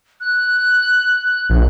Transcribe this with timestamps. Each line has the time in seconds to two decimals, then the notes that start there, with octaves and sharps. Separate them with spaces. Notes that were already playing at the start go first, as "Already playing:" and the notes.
0.21 F#6
1.49 A#1